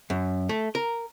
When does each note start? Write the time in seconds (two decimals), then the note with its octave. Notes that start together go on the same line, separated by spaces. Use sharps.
0.10 F#2
0.49 A3
0.75 A#4